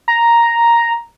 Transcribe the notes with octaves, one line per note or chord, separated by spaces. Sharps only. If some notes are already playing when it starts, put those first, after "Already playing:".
A#5